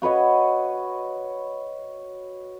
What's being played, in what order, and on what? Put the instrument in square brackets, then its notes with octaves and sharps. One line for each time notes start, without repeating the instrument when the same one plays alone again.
[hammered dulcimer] F#4 B4 C#5 D#5